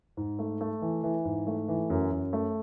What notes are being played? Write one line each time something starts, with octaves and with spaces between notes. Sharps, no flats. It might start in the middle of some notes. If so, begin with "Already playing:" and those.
G#2
A3
A3
E3
E3
G#2
A3
E3
F#2
F#2
A3